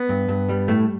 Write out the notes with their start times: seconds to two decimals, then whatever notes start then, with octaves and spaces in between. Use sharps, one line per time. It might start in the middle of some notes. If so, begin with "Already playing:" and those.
Already playing: B3
0.09 G2
0.28 G2
0.49 G3
0.68 A2 A3